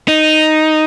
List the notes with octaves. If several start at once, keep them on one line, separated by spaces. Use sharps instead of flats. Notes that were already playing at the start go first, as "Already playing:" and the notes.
D#4